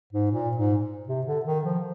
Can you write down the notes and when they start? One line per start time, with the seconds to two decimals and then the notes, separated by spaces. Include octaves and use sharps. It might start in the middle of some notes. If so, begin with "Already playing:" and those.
0.13 G#2
0.32 A#2
0.57 G#2
1.08 C3
1.27 D3
1.46 D#3
1.65 F3